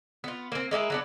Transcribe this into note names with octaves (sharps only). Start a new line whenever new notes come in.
B3 F4
A#3 C4
G#3 A#3 E4 G#4
F#3 B3 D4